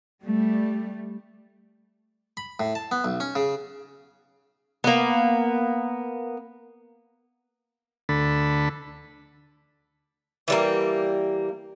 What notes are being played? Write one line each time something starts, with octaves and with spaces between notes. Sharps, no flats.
G3 A3
B5
A2
A5
B3
B1
C#4
C#3
A#3 B3
D2 D3 A4 B5
E3 G3 A#3